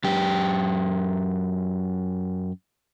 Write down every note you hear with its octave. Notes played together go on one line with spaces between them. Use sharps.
F#2 G4